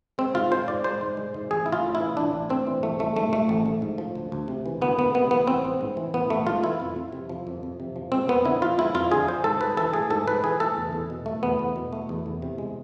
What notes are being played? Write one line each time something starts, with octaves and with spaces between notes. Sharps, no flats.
G#3 C4
G#2 F4
G#3 C5
G#2 D5
G#3 C5
G#2
G#3
G#2
A1 G#4
A1 E4
F4
A2
E4
E3
A1 D4
A1
A2 C4
E3
A1 A3
A1 A3
G#2 A3
F3 A3
A1
A1
G#2
F3
D2
D2
C3
E3
D2 B3
D2 B3
C3 B3
E3 B3
A1 C4
A1
G#2
E3
A1 B3
A1 A3
G#2 F4
E3 E4
F2
F2
C3
F3
F2
F2
C3
F3
G#3 C4
F2 B3
D3 E4
F3 F4
G#3 E4
F2 F4
D3 G#4
F3 C5
G#2 A4
G#2 B4
E3 A4
A3 G#4
G#2 A4
G#2 B4
E3 G#4
A3 A4
E2
E2
B2
A3
E2 B3
E2
B2
A3
E2
E2
C3
G#3